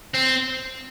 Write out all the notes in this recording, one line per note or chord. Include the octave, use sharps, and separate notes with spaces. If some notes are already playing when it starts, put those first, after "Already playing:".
C4